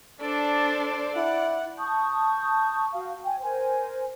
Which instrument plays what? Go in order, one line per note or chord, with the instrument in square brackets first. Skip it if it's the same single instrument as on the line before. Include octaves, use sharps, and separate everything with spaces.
[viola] D4 [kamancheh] A4 C5 [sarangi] D5
[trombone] E4 [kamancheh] F#5
[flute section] A5 C#6 D#6 G6
F#4 F5
G5 G#5
A#4 C5 G#5